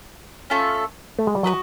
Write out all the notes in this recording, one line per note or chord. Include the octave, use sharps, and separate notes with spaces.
A3 C#4 F4 A4
A3
G#3
G3
F#3 F#4 B4 D#5